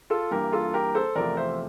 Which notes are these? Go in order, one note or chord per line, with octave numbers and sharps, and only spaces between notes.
F4 A4
G2 E3 A#3 G4 A#4
F4 A4
G4 A#4
A4 C5
E2 C3 F3 A3 A#4 D5
C5 E5